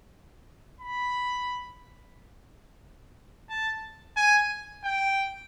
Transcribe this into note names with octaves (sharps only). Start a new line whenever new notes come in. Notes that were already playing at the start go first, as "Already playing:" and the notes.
B5
A5
G#5
G5